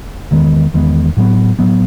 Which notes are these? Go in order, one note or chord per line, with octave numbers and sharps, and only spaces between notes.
E2 D#3 G#3 B3
E2 D#3 G#3 B3
A2 F#3 B3
A2 F#3 B3